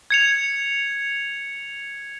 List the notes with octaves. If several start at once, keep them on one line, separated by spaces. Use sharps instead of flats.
G#6 C#7 F7